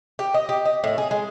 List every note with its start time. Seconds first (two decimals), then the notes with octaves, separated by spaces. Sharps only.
0.19 G4
0.34 D#5
0.49 G4
0.65 D#5
0.84 A2
0.98 G#4
1.11 G#3